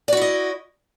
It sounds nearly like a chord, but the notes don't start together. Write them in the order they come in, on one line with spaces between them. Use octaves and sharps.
D5 F#4 E4 D#5